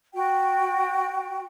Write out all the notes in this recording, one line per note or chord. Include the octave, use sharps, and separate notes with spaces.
F#4 G5